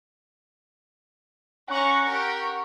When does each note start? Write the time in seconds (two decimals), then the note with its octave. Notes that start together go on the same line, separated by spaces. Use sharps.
1.68 C#4 C#5 F#5 A#5 C#6
2.05 G4 A#4